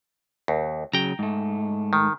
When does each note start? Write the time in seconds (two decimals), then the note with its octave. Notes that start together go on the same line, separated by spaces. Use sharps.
0.48 D#2
0.93 C#3 F#3 G5 A#5
1.19 G#2 A3
1.93 D#3